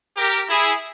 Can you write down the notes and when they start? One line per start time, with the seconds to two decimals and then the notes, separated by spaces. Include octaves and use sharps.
0.17 G4 A#4
0.50 E4 G#4